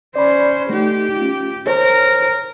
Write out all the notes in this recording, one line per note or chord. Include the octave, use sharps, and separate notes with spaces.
C#4 C5 D5 B5
A3 D#4 G4
C#4 F4
A#4 C5 C#5